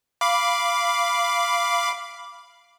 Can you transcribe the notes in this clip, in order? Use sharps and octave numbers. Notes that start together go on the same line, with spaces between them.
F5 B5 D6